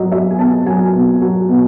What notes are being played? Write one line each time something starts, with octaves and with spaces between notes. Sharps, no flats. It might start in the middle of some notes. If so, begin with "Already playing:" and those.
Already playing: F#3 D#5
F#3 E5
G#5
B2 A5
F#3 G#5
B2
F#3
B2